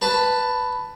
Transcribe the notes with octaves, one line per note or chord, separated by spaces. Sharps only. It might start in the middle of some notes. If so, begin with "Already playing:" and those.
B4 A5 B5